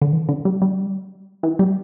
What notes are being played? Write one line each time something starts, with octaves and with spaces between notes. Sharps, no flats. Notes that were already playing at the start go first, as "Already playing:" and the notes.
D3
E3
D3
G3
G3
E3
G3